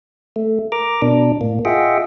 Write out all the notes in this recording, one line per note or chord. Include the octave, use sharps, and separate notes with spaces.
A3
A#4 A#5 D6
B2 D4
A2 A#3
F4 G#4 D#5 E5 F#5 G5